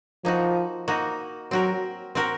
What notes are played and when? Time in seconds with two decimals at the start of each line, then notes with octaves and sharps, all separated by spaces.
0.24 F3 A#3 D#4 F#4
0.88 A#3 D#4 F#4
1.51 F#3 C4 F#4 A#4
2.15 C4 F#4 A#4